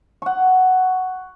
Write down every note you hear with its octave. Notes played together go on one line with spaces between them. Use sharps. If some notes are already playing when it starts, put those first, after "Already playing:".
F#5 C#6